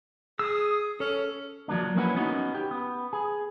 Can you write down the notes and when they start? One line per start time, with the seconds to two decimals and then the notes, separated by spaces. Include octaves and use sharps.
0.39 G#4 D#6 E6
1.00 C#4 A4
1.68 F3 F#3 A#3 D4
1.96 A#3 C#4 E4 B4 F#5
2.16 B3 C#4 D#4 F#4
2.55 G4
2.71 B3
3.13 G#4